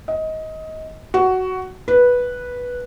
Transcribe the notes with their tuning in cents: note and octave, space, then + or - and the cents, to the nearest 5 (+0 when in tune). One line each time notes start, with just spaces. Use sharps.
D#5 +20
F#4 +10
B4 -10